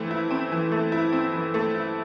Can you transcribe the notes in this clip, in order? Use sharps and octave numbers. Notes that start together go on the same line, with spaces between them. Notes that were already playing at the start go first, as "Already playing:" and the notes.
Already playing: E3 A3 C4 E4
E4
C4
E3
A3
E4
C4
E3
A3
E4